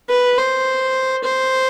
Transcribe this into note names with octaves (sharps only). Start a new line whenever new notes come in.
B4
C5
C5